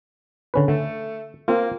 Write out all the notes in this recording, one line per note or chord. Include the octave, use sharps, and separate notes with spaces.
D3 C#4 B4
D3 A3
A#3 C4 F4